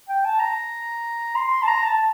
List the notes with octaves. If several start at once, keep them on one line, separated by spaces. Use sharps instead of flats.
G5
A5
A#5
C6
A5
A#5
A5